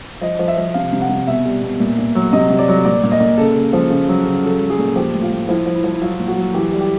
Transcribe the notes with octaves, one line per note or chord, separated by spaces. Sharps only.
F3 D#5
F3
E5
F3
C3 F5
C3
F#5
C3
B2 E5
G3
B2
A#2
A#2
F#3
C3 D#5
C3
D5
F#3
A#2 D5
A#2
D#5
A#2
C#3 A4
C#3
F3
C#3
F#3
C#3
F#3 A4
F#3
G#4
A#2
F3 G4
A2
F4
A2
F3 E4
F3
E4
F3
E4
F#3 F4
A#2
F#4
F#3
E3 G4
G3
G4